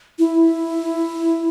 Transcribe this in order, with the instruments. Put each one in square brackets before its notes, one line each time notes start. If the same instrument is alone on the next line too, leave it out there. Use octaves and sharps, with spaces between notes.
[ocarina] E4